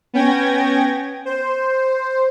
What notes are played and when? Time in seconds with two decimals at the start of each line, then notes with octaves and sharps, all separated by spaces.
0.13 B3 C#4 G5 G#6 A#6
1.25 C5